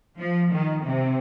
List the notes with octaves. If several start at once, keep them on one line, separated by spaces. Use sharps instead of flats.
F3
D#3
C3